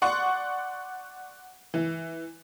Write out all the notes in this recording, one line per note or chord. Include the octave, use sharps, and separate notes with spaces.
D5 F#5 C6 C#6
E3